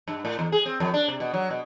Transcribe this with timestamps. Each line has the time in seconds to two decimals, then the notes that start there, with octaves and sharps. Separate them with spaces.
0.08 G2
0.25 A2
0.39 E2
0.52 G#4
0.66 C4
0.80 F2
0.94 D4
1.08 C3
1.20 B2
1.34 F#3
1.50 B2